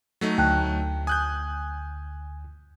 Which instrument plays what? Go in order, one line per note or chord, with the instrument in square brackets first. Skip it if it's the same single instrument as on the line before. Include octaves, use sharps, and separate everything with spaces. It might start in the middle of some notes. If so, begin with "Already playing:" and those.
[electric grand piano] F#3 A3 D#4
[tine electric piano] D2 [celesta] G5 A5 F#6
[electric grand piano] G#5 F#6 G6 [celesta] D#6